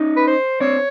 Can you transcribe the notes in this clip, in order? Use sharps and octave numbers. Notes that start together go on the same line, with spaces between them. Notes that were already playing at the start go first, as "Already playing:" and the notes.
Already playing: C#4 D#4
B4
C5
C4 D4 C#5